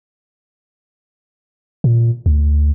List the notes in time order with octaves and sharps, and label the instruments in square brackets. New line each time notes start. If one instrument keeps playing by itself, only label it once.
[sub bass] A#2
D2